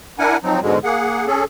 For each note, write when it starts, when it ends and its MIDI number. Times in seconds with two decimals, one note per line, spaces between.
0.19 0.37 62
0.19 0.37 64
0.19 0.37 70
0.19 0.37 78
0.19 0.37 80
0.44 0.60 53
0.44 0.60 54
0.44 0.60 60
0.44 0.60 63
0.62 0.79 44
0.62 0.79 47
0.62 0.79 50
0.62 0.79 56
0.84 1.26 58
0.84 1.26 68
0.84 1.26 78
1.27 1.44 61
1.27 1.44 68
1.27 1.44 69